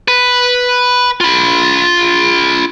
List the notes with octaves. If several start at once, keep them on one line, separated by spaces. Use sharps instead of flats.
B4
F4 B5